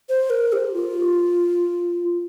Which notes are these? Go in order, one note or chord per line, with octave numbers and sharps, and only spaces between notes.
C5
A#4
G4
F4